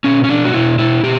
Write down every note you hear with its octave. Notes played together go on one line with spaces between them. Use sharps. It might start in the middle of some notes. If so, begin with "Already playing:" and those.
B2 C#4
C#4
B2 D4
F#4
B2 E4
B2 E4
B2 G4